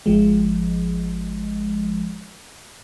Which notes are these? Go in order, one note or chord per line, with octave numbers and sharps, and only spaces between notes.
G#1 F3 G#3